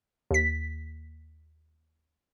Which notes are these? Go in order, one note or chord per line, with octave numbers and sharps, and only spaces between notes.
D#2 B6